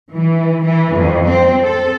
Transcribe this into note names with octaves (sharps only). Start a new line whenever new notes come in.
E3
E3
F2
C4
A4